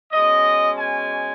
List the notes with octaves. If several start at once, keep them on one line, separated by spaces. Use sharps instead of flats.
B2 G#3 C#4 D#5
G#5